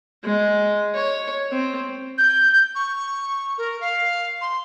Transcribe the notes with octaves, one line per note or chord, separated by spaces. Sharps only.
G#3
C#5
C4
G6
C#6
A#4
F5
C6